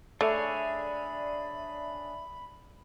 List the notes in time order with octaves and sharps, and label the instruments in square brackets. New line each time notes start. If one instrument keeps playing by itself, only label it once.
[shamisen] A3 [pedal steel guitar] D4 G#4 C#5 [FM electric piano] D5 E5 [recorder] B5